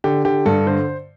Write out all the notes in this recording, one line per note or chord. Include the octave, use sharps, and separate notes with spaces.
D3 G4
D3 G4
G2 A4
D3 C5